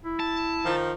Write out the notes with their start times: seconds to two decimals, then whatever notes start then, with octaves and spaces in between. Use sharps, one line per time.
0.04 E4
0.20 A5
0.65 D#3 F3